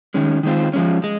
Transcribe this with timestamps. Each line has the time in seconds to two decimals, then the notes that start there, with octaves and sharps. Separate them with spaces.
0.14 D#3 G#3 C#4
0.43 D#3 G#3 C4 F4
0.73 F3 G#3 C#4
1.04 G#3